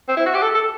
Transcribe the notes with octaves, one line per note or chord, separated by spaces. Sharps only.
C4
E4
F#4
G4
A4
A4